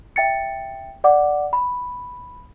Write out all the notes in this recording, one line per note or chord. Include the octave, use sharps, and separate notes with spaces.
E5 G5 A6 C#7
D5 F#5 D6
B5